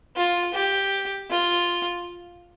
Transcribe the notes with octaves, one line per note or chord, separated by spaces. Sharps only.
F4
G4
F4